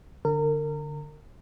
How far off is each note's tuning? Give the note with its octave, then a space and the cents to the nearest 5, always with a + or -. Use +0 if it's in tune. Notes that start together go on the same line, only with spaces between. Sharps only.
D3 +0 A#4 -30